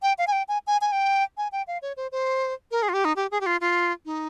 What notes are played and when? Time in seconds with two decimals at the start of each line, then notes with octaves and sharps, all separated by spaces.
0.02 G5
0.18 F5
0.27 G#5
0.32 G5
0.48 G#5
0.67 G#5
0.81 G#5
0.92 G5
1.37 G#5
1.52 G5
1.67 F5
1.82 C#5
1.97 C5
2.12 C5
2.71 A#4
2.82 G#4
2.89 F4
2.93 G4
3.05 D#4
3.16 G4
3.31 G#4
3.41 G4
3.46 F4
3.61 F4
4.05 D#4